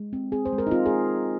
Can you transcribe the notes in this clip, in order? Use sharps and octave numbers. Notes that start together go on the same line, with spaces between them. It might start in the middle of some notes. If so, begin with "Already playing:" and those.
Already playing: G#3
C4
C4 G#4
C5
G#3
A#4
D#4
C4 F4
G#4